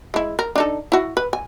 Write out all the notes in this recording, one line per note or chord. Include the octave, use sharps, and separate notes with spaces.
G#3 E4
A#4
D4 D#4 A4
E4 F#4
B4
G#5